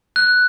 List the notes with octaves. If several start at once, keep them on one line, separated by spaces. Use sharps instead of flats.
F#6